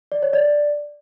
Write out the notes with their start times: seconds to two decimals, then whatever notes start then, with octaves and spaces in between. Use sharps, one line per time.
0.12 D5
0.23 C#5
0.33 D5